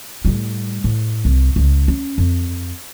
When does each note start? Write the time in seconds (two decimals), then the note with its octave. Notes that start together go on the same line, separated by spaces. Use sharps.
0.25 A2 G3
0.84 A2
1.25 C2
1.56 C#2
1.88 C#4
2.18 F2